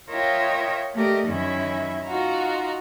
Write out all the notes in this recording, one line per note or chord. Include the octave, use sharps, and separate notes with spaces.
F4 A#4 C#5 D#5 E5 G5
A3 G4 A#4 D5 D#5
F#2 D#3 C#4 E4 E5
D#4 F4 F#4 A#5